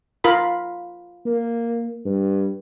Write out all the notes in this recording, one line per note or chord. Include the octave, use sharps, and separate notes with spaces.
F4 A#4 B5
A#3
G2